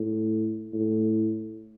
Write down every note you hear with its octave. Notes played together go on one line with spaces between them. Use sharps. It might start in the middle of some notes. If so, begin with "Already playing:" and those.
Already playing: A2
A2